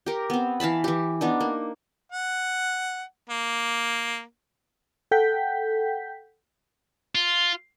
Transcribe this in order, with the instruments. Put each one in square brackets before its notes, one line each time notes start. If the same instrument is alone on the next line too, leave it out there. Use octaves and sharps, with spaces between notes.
[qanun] G4 A#4
B3 C4
E3 F5 A5 B5
E3 G4
B3 D4 D#4
A#3
[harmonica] F#5
A#3
[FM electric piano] A4 F#5 G5 G6 B6
[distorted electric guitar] F4